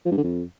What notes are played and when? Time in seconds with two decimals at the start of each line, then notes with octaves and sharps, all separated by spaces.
0.05 F3
0.11 G2
0.17 D3
0.23 F2